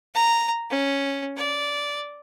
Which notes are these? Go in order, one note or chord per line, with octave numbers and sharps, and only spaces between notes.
A#5
C#4
D5